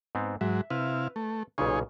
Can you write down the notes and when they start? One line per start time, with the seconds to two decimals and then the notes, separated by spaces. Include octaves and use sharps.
0.15 G#2 B3 C4
0.41 G#2 F#3 E5
0.70 C3 E4 B4 F5
1.16 A3
1.58 B1 A#2 C#3 D#4 G#4 C#5